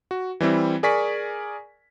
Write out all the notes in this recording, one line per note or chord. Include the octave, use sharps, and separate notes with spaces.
F#4
E3 G3 C4 E4
G#4 A#4 D5 G#5 C#6 B6